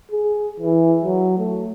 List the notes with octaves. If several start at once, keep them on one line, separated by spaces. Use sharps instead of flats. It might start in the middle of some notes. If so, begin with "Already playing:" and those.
G#4
E3
F#3
A3